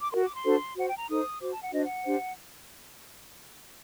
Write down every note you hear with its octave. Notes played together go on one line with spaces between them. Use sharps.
D6
F#4 A#4 C6
D6
C6
D4 F#4 A4 C5
F#4 C5 F#5
G5
A#5
D#4 A4 C5 D#6
F#4 C5 D6
A5
F#5
D4 F#4 C5 D#5
F#5
D4 G4 C5